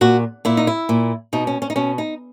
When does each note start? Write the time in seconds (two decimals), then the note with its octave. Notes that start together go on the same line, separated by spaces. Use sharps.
0.01 A#2 F#4
0.45 A#2 E4
0.57 D#4
0.67 E4
0.89 A#2
1.33 B2 D#4
1.47 C#4
1.62 C#4
1.70 D#4
1.76 B2 C#4
1.98 D#4